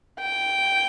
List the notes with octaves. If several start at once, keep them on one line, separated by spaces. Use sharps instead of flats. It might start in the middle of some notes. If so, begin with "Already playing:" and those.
G5